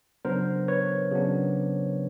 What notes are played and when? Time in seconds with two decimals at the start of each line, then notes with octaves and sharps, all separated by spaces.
0.25 C#3 F#3 B3 D4 A#4 C5
0.68 B4 C#5
1.11 C#3 F#3 B3 D4